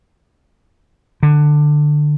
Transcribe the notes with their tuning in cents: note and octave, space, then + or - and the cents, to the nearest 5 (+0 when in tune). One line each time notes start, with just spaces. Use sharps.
D3 +20